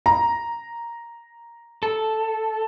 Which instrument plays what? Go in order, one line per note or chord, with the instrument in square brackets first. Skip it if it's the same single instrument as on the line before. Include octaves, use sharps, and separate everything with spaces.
[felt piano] A#5
[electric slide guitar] A4